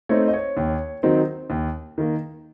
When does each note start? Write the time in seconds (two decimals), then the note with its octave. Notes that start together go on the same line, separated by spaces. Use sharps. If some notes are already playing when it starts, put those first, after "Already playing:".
0.09 A3 C4 D#4 C#5
0.28 D#5
0.33 C#5
0.57 D#2
1.03 D#3 F#3 C4 D#4
1.50 D#2
1.98 D#3 A#3